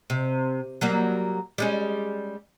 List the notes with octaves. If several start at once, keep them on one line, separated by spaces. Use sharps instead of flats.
C3
F#3 G3 A#3
G3 G#3 C#4